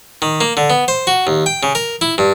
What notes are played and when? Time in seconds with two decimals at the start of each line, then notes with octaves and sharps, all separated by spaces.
0.22 D#3
0.41 A#3
0.57 D3
0.70 B3
0.88 C5
1.07 F#4
1.27 D#2
1.46 G5
1.63 C#3
1.75 A#4
2.01 E4
2.18 G2